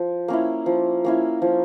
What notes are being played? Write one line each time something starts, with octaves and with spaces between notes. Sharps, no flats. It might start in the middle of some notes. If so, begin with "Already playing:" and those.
Already playing: F3
A#3 C#4 E4
F3
A#3 C#4 E4
F3